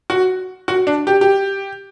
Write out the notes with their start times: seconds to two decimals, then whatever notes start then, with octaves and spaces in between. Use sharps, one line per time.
0.10 F#4
0.68 F#4
0.87 D4
1.07 G4
1.21 G4